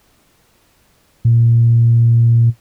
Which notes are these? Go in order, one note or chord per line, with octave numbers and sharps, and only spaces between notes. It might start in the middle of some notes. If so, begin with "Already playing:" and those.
A#2